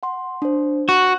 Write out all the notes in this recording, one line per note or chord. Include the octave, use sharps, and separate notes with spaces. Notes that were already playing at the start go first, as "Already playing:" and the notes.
F#5 C6
D4 C5
F#4 F#6